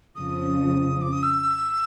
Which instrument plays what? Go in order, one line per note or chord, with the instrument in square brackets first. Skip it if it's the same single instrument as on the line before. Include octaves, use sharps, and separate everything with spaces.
[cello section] F2 C#3 F3 [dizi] D#6
[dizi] D6
D#6
E6